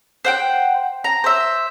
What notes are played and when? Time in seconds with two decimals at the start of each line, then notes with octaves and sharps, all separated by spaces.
0.25 C5 F#5 G5
1.04 A#5
1.24 C5 E5